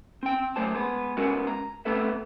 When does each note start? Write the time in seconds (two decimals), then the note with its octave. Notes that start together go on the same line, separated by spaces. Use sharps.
0.23 C4 G5
0.56 F#2 A3 C5 A5
0.75 G#3 B3 B4
1.17 G#3 B3 C#4 F#4 A#4
1.47 A#5
1.85 A3 B3 C4 A4 B4 E5